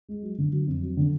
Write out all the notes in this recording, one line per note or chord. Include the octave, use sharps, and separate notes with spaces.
G#3
F#3
D3
F#3
F2
F#3
D3